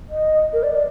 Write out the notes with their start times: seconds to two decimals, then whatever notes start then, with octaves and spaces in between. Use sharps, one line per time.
0.10 D#5
0.53 A#4
0.63 D5
0.74 D5